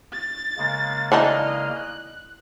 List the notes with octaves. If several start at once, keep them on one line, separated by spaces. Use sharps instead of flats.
A6
C#3 G#3 A#3
E3 D4 D#4 D#5 F6
F#6